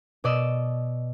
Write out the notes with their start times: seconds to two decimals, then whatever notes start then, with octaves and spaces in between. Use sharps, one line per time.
0.24 B2 D5 D#5 E6